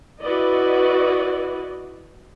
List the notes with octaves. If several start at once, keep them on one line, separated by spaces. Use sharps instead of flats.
E4 F#4 B4 D5 D#5